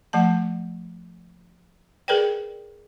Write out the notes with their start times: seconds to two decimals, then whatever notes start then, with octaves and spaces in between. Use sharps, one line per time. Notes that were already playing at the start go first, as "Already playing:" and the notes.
0.13 F3 A3 A5
2.08 G#4 A#4 B4 D5 G5